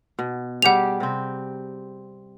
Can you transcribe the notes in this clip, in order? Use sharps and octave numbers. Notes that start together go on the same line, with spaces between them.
B2
G3 G4 G#4 F#5 F7
C3 C4